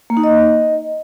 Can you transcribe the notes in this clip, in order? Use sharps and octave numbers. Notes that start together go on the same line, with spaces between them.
A#3
D#4
D#5